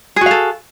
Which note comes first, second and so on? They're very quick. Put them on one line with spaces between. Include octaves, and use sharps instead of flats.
G#4 F#4 F5 A4